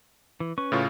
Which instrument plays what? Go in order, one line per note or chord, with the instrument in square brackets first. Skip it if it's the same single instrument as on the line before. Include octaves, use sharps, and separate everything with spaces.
[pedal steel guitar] E3
C#4 B4 C#6
[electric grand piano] A2 C#3 F4